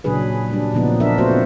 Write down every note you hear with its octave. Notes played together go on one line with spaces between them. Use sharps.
A#2 C#3 F#3 D4 G#4 B4
G3 D4
A#2 C#3 F3 B3 D#4
D4 A#4 E5
A3 B3 C4 F4 F#4 C5